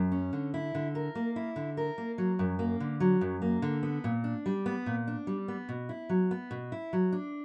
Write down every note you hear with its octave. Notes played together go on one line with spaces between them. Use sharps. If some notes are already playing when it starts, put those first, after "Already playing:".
Already playing: F#2
C#4
D3
E4
D3
A#4
A#3
E4
D3
A#4
A#3
F#3
F#2
A#3
D3
F#3
F#2
A#3
D3
B3
A#2
D4
G3
B3
A#2
D4
G3
B3
B2
E4
F#3
B3
B2
E4
F#3
D4